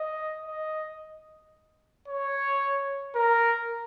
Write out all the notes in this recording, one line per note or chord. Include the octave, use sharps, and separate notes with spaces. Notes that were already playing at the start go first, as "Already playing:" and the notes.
Already playing: D#5
D#5
C#5
A#4